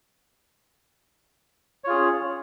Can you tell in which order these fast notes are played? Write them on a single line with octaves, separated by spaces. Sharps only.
C#5 F4 G#4 C#4